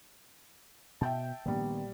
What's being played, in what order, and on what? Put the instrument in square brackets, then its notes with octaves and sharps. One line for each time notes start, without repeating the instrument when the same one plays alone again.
[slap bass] B2 [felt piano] E5 G5 A5
[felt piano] A#1 G3 [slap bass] D#3 B3